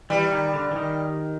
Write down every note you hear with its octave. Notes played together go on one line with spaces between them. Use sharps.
E3 G3
D#3
D3
E3
D#3